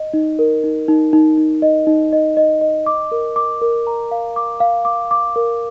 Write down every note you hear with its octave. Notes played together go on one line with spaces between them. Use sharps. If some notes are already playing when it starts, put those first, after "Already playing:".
Already playing: D#5
D#4
A#4
D#4
D#4
D#4
D#4
D#5
D#4
D#5
D#5
D#5
D6
A#4
D6
A#4
A#5
F5
D6
F5
D6
D6
A#4